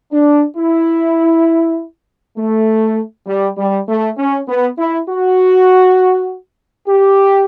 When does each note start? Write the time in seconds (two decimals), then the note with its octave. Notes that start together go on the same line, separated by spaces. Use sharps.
0.12 D4
0.57 E4
2.37 A3
3.27 G3
3.58 G3
3.88 A3
4.18 C#4
4.48 B3
4.78 E4
5.09 F#4
6.88 G4